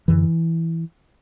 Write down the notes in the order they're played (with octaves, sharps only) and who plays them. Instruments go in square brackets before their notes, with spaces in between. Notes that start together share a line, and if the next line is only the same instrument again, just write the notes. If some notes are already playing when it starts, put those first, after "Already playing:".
[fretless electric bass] F#2 D3 E3